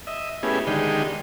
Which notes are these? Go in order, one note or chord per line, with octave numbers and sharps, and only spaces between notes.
D#5 E5
A3 B3 C#4 E4 G4 G#4
D3 D#3 G#3 D#4 G4